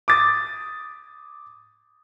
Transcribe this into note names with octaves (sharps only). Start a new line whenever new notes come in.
D6 D#6 A6